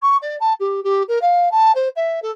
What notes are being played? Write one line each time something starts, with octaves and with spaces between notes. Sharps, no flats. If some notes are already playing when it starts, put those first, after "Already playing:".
C#6
D5
A5
G4
G4
A#4
F5
A5
C5
E5
A4